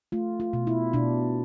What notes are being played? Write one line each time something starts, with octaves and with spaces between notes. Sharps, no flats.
A3 F4
F4
B2
E4
B2 D4